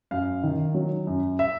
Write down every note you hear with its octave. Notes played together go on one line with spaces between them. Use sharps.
F#2 F5
D#3
F#3
F#2
E5